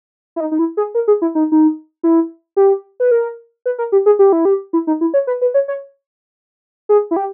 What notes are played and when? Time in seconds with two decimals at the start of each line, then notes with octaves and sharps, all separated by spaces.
0.36 E4
0.40 D#4
0.52 D#4
0.59 E4
0.77 G#4
0.95 A#4
1.08 G#4
1.22 E4
1.35 D#4
1.52 D#4
2.03 E4
2.57 G4
3.00 B4
3.11 A#4
3.66 B4
3.78 A#4
3.92 G4
4.06 G#4
4.19 G4
4.32 E4
4.45 G4
4.73 E4
4.87 D#4
5.01 E4
5.14 C#5
5.27 B4
5.42 B4
5.54 C#5
5.68 C#5
6.89 G#4
7.11 E4
7.16 G4